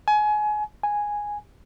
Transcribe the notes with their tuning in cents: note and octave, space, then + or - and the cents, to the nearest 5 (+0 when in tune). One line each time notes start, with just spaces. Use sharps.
G#5 +25
G#5 -5